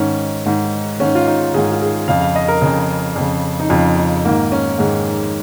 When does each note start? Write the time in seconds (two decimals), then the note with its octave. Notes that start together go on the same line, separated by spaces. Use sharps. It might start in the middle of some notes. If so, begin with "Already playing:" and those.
Already playing: G#2 D#3 C#4
0.46 G#2 D#3
0.99 G#2 D#3 C#4
1.15 F4
1.27 D#4
1.54 G#2 D#3 G#4
1.71 F4
1.81 G#4
2.08 F2 C#3 F5
2.21 F5
2.36 D#5
2.48 A#4
2.62 F2 C#3 G#4
3.16 F2 C#3
3.60 D#4
3.70 F2 C#3 F4
3.98 D#4
4.25 G#2 D#3 A#3
4.52 C#4
4.79 G#2 D#3 G#3